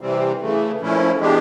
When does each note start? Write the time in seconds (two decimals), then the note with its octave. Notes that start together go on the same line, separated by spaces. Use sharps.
0.01 C3 E3 G3 C4
0.40 C#3 E3 A3
0.80 A#2 F3 A3 C#4 E4
1.19 E3 G#3 B3 D4 G4